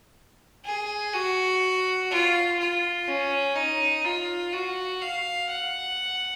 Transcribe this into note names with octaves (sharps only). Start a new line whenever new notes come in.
G#4
F#4
F4
F4
C#4
D#4
F4
F#4
F5
F#5